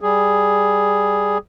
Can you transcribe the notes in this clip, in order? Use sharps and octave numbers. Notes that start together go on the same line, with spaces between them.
G3 G#4